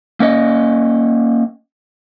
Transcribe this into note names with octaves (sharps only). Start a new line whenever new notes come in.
A#3 C#4 D#5